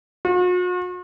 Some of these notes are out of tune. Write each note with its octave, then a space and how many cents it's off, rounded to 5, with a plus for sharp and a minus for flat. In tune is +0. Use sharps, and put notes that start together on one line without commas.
F#4 -45